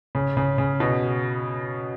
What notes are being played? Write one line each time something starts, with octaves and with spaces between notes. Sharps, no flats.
C#3
C#3
C#3
B2